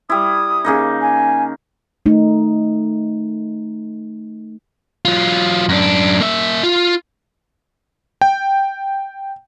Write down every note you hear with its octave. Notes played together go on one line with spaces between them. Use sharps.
G3 E4 D#6
C#3 A#3 D#4
G#5
A3 D#4
F#3 F4
F#2 D4
A#3 E5
F4
G5